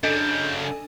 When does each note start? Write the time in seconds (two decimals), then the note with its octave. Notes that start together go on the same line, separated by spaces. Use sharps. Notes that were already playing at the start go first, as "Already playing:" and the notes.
0.03 F#2 C#3 D4 A4 D#5 G6
0.64 G#5